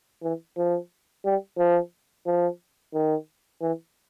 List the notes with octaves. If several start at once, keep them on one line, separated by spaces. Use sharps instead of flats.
E3
F3
G3
F3
F3
D#3
E3